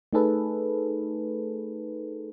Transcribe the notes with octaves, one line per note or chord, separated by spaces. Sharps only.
A3 D#4 G#4 A4 B4